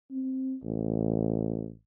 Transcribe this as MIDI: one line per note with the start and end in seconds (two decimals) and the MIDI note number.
0.11 0.56 60
0.63 1.70 33